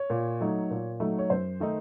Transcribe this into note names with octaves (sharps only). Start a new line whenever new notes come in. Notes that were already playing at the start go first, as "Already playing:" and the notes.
Already playing: C#5
A#2
F#3 A3 D#4
A#2
F#3 A3 D#4
C#5
F#2 C5
D#3 A3 D#4